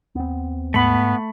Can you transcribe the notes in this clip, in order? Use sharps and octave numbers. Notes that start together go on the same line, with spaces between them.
D#2 B3 C4
G#2 A3 B3 B5